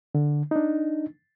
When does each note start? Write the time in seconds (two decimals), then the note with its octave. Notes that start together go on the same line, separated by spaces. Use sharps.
0.15 D3
0.51 D4 D#4